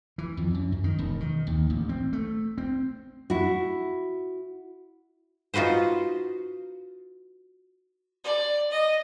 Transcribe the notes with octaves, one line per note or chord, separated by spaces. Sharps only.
E3
F2
F#2
F#2
D#3
E1
D#3
D#2
A1
C4
A3
C4
E4 F#4
D#4 F4 F#4 B4 C5
D5
D#5